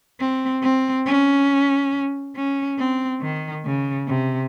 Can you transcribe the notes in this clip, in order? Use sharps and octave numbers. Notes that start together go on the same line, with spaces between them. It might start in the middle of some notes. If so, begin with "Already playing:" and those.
C4
C4
C#4
C#4
C4
D#3
C#3
C3